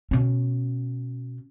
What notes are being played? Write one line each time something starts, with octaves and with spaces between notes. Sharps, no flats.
B2 C#4